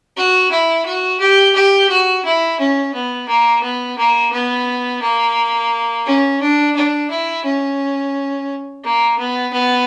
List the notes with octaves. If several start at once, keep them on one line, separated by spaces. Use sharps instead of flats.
F#4
E4
F#4
G4
G4
F#4
E4
C#4
B3
A#3
B3
A#3
B3
A#3
C#4
D4
D4
E4
C#4
A#3
B3
B3